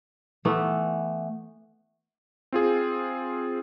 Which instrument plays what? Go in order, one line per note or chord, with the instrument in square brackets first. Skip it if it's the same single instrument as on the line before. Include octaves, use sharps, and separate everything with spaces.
[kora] E3 A3 B3
[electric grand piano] C4 F4 G#4